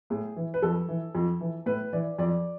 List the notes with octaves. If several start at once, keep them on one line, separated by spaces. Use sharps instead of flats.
A2 G#4
E3
B4
F2 A4
E3
F2
E3
A2 B4
E3 D5
F2 D5